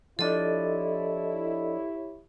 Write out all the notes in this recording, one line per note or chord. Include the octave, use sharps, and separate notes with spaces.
F3 D4 E4 G4 A4 C#5 D#5